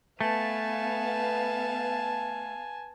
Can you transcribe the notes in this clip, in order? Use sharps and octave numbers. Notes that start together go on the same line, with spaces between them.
A3 B3 B4 F5 G#5 A5